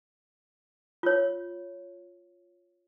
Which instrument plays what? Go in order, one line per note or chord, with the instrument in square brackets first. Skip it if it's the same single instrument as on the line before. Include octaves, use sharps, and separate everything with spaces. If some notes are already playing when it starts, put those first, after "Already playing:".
[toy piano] F4 C#5